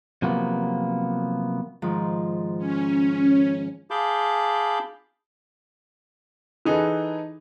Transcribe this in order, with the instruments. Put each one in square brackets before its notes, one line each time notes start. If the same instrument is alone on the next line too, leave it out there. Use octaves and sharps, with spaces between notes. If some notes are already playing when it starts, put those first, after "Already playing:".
[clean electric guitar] C3 F3 F#3 A#3 B3
[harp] G#2 D#3 F3
[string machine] C#4
[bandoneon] G#4 F5 A5 B5 D6 G6
[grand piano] E3 D#4 G#4 A4 B4